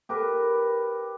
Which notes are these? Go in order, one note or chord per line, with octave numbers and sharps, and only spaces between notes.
G4 A#4 B4